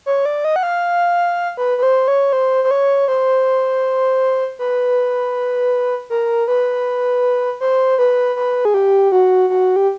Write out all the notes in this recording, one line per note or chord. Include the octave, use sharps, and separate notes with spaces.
C#5
D5
D#5
F#5
F5
B4
B4
C5
C#5
C5
C5
C#5
C5
B4
A#4
B4
C5
B4
B4
G#4
G4
F#4
F#4
G4